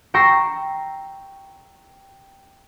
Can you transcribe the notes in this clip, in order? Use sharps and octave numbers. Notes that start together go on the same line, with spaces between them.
G5 A#5 C#6 E6 A#6 C7